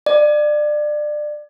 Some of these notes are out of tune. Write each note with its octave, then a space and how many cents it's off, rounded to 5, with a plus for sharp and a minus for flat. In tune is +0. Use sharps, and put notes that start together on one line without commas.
D5 +25